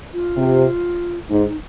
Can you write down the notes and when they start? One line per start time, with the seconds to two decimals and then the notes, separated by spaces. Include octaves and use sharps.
0.13 F4
0.36 C3
1.30 G#2 D#4
1.45 D#4